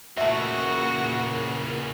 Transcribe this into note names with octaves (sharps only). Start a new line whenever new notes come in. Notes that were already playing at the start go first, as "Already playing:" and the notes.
E2 A#2 C#3 A3 F#4 A#4 B4 E5